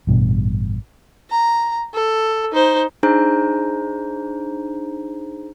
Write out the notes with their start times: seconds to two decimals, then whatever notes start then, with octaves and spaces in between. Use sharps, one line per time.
0.07 A1 G2 B2 B3
1.30 A#5
1.94 A4
2.52 D#4 C5
3.03 D4 D#4 G#4 C5 A#5 G6